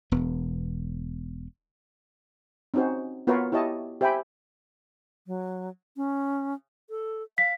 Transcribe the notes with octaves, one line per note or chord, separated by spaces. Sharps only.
E1 B3
C4 C#4 D#4 F#4 C5
B3 F4 F#4 A#4 B4 C#5
E4 G4 C#5 D#5 A5
G4 C5 E5 G5 G#5 B5
F#3
C#4
A4
F5 B6